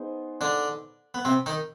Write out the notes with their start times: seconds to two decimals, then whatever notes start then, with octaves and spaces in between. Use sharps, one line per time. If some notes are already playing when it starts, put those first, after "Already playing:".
Already playing: B3 D#4 G#4 C5
0.41 D3 D4
1.14 B3
1.25 C3 C4
1.46 D#3 D#4